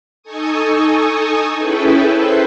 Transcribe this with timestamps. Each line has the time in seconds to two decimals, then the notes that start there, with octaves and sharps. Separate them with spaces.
0.23 D#4 A4 G#5 C#6 D#6
1.56 C#4 E4 G#4 A4 B4 G5
2.14 A4 B4 C5 E5 C6 G6